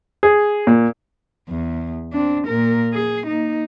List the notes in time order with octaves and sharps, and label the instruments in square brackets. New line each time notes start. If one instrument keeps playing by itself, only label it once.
[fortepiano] G#4
A#2
[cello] E2
C4 D4
A#2 A#4
G#4
A#3 D#4